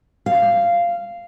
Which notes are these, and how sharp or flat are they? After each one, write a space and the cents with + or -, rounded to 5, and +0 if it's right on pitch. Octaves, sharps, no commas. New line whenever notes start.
F5 -10